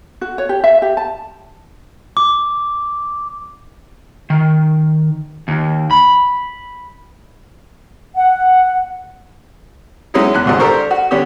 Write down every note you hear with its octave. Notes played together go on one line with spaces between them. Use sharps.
F#4
C#5
G4
E5
G4
A5
D6
D#3
D#2
B5
F#5
F#3 G#3 C#4 D#4 E4
E2 F#6
C2 G#2 D3 G#3
D4 G4 A4 A#4 C5 C#6
F#4
D3 G3 B3 C#4 G4